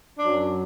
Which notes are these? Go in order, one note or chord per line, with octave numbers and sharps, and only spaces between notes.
F#2 F#3 D4